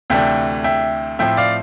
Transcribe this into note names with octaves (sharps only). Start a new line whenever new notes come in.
D2 C3 E3 A3 D4 E5 G5
E5 G5
A2 F3 C4 E4 E5 G5
D5 F5